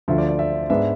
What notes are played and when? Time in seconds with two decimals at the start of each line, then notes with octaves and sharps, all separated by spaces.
0.08 D2 D3 F3 E5
0.18 D5
0.29 D5
0.39 E5
0.70 G#2 G#3 B3 D4 E5